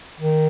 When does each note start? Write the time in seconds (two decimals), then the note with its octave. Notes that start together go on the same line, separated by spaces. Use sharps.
0.19 D#3